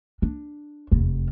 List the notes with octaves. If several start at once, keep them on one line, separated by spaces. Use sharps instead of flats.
D4
F1 E2